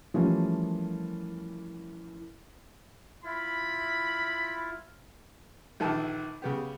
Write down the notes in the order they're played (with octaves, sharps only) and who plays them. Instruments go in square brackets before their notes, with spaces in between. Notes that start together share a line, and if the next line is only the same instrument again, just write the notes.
[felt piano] E3 F3 G3 A3 A#3 C#4
[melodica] E4 F4 [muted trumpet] B5
[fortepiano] A#1 D#3 E3 A4 A5
C#3 B3 G4